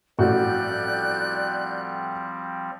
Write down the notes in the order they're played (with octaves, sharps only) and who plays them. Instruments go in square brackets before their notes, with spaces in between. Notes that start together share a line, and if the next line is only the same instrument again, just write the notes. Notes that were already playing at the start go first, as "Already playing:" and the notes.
[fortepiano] A1 [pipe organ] F3 G3 C4 [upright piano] F#4 [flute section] D5 F#6 G6